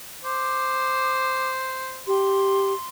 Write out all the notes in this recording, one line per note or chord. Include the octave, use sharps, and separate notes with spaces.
C5 D6
G4 C6